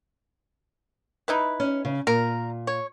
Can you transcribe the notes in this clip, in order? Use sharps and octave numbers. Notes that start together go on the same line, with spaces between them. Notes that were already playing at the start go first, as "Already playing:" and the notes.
D#4 E4 B4
C#4
C#3
A#2 A#4
C#5